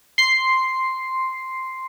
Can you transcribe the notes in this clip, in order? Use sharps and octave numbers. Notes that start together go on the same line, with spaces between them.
C6 C7